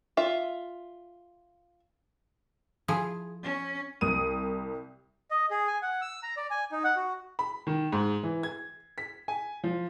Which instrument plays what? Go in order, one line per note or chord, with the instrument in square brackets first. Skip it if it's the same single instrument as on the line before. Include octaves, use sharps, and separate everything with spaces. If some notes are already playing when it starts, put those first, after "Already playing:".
[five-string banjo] F4 E5
[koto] F3 E4 G#4
[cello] C#4
[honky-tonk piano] C2 D#6 D#7
[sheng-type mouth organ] D#5
G#4
G#5
F#5
E6
A#5
D5
G#5
D#4
F#5
F#4
[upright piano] B5
D#3
G#2
E3
G#6
B6
G#5
F3